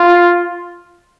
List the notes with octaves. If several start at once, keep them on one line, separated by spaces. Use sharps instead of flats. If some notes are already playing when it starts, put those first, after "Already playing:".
Already playing: F4